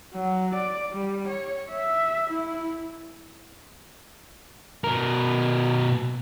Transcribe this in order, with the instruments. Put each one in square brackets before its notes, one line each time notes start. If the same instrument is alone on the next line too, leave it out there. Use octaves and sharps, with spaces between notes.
[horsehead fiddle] F#3
D5
G3
C#5
E5
E4
[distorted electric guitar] B2 A#4